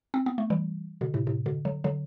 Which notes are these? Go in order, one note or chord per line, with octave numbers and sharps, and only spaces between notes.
C4
B3
A3
E3 G3
B2 D3
A2 C3
A2 C3
B2 D3
D3 F#3
D3 F#3